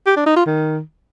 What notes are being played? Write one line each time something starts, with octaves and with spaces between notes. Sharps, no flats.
G4
D4
D#4
F4
D#3